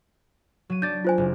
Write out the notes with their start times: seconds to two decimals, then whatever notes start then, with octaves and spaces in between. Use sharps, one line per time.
0.70 F#3 D#7
0.82 D4 D5 G6 A6
1.05 F4 C5 G#5
1.18 F#1